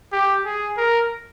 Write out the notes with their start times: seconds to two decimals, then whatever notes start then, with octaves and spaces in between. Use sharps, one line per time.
0.12 G4
0.45 G#4
0.77 A#4